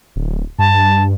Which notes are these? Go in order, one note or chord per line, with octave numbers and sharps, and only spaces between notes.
D1
G2 A5